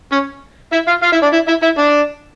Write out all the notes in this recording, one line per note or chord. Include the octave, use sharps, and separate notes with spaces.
C#4 C#5
E4 E5
F4 F5
F4 F5
E4 E5
D4 D5
E4 E5
E4 E5
E4 E5
D4 D5